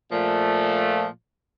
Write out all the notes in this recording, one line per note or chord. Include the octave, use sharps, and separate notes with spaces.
A#2 F3 A3